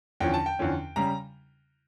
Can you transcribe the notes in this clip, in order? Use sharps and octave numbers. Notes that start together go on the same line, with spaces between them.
E2 D3 F3 C#4 G5
A5
G5
E2 D3 F3 C#4
C#3 G3 A#5